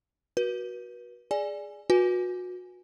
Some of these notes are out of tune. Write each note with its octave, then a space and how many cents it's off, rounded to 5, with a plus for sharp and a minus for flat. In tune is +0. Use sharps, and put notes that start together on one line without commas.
F#4 +0 B4 -35
G#4 +0 D5 +0 G#5 +0
F#4 -30 B4 -20 G#5 +0